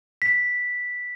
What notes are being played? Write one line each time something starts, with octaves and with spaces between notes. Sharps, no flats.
B6